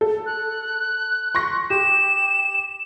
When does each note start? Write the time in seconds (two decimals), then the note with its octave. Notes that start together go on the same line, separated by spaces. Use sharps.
0.01 A4
0.26 F#6
1.35 C6 C#6 A#6
1.70 G4 E7